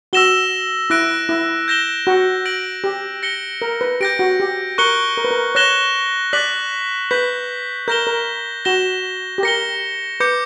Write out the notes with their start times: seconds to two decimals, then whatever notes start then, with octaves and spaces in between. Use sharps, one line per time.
0.13 F#4 E6 A#6 E7 G7
0.90 E4 F#6 A#6 D7
1.29 E4
1.68 G6 A#6 E7 G7
2.07 F#4
2.46 A#6 D7 F#7
2.84 G4
3.23 A#6 C#7 G7
3.62 A#4
3.81 B4
4.00 G4 G6 A#6 D7
4.19 F#4
4.40 G4
4.78 A#4 C#6 F#6 C#7 G7
5.17 A#4
5.25 B4
5.31 A#4
5.55 C#5 F#6 A#6 E7 G7
6.33 D5 F#6 B6 F#7
7.11 B4 G6 B6 F#7
7.88 A#4 G6 A#6 E7 G7
8.07 A#4
8.65 F#4 A#6 E7 G7
9.38 G4
9.43 A#4 A#6 C#7 G7
10.20 B4 D6 G6 C#7